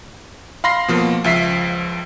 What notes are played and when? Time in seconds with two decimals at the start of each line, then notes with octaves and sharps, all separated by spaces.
0.64 F5 B5 C6 A#6 C7
0.88 B2 F3 A#3
1.24 C#2 F3 E5 B6 C7